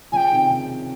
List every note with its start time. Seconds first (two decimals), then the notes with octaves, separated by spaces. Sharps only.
0.12 C#3 F3 G5 G#5
0.32 C3 D#3
0.50 C#3
0.69 C3